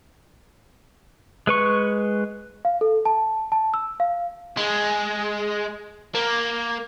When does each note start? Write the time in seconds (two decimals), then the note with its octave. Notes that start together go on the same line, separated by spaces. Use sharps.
1.47 G#3 B4 C#6
2.65 F5
2.81 A4
3.05 A5
3.52 A5
3.74 E6
4.00 F5
4.57 G#3
6.15 A#3